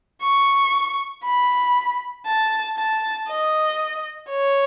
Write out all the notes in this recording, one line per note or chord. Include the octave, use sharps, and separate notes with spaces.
C#6
B5
A5
A5
D#5
C#5